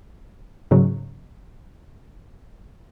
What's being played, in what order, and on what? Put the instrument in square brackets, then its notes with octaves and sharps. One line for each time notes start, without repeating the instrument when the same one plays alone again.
[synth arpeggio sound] G#2 C#3 F#3